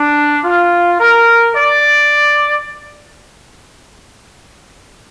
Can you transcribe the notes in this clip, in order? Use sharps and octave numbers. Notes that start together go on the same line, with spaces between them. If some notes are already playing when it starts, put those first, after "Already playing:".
Already playing: D4
F4
A#4
D5